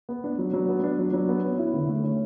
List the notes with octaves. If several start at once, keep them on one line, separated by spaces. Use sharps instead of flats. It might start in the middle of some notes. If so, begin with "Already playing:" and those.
B3
D4
F#3
F#3
B3
D4
F#3
F#3
B3
C#4
E4
D3
A3
C#4